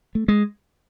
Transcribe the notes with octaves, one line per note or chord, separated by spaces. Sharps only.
A3
G#3